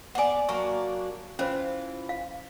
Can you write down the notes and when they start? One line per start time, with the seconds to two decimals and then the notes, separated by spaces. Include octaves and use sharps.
0.15 B3 D5 F#5 G#5
0.49 F#3 A#3 D4 C#6
1.39 E3 C#4 F4 C5
2.09 F5